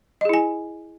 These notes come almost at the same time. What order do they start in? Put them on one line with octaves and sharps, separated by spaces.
D#5 G#4 E4 G#5